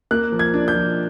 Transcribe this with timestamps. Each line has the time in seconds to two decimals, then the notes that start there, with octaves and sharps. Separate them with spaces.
0.11 A#3 F#6
0.32 F3
0.39 G#6
0.54 D4
0.68 G6
0.75 F3